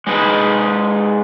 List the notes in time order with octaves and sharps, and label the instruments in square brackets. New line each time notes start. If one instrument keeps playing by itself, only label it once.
[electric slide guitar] G#3 D#4 B4